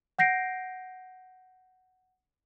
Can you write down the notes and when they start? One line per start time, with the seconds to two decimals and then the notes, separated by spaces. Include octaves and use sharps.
0.19 F#5 G6 A#6 C7 D7